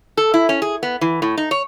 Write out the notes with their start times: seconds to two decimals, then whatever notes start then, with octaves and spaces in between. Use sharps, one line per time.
0.17 A4
0.34 E4
0.49 C#4
0.62 G#4
0.83 B3
1.01 E3
1.22 A2
1.37 D#4
1.51 C#5